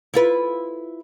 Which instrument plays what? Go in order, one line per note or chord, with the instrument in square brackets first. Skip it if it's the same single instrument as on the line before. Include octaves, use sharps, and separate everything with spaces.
[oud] E4 F4 B4